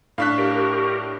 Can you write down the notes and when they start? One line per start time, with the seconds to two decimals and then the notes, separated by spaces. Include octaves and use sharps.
0.18 A2 D4 F5 C#6 F#6 B6
0.38 G4 A#4